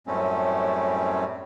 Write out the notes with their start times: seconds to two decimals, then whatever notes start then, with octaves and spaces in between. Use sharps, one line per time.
0.07 F#2 A2 G3 A3 C4 C#4